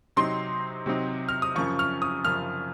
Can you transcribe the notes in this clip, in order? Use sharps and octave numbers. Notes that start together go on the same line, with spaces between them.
C3 F#3 C4 D#4 C6
C3 F#3 C4 D#4
F6
D#6
F#2 C#3 F3 C#6
F6
D#6
F#2 C#3 F3 F6